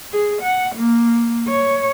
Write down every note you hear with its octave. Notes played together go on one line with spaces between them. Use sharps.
G#4
F#5
A#3
C#5